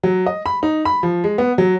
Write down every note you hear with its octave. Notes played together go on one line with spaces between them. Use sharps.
F#3
D#5
B5
D#4
B5
F3
G#3
B3
F#3